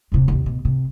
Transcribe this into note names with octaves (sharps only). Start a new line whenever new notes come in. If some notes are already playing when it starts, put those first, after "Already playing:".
D#1 C3
D#2 C3
B2
C3